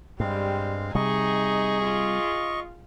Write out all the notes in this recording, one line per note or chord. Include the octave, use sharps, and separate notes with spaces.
G2 G3 G#3 C4 F5
C3 G3 D#4 G#4 D#5 C#6
F4